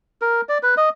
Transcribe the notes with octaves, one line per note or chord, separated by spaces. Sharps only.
A#4
D5
B4
D#5